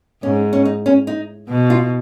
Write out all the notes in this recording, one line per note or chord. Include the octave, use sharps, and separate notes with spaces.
G#2 C#4
C#4
D#4
C#4
D#4
B2
F4